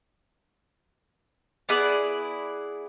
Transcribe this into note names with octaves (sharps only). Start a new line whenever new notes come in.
B3 E4 G#4 D5